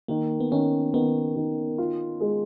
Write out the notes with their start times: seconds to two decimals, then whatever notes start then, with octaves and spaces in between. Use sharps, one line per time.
0.08 D#3 A#3
0.40 B3
0.52 D#3 C#4
0.94 D#3 B3
1.36 D#3
1.78 F4
2.20 G#3